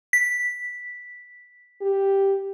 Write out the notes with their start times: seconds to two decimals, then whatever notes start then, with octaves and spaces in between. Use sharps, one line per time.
0.13 B6
1.81 G4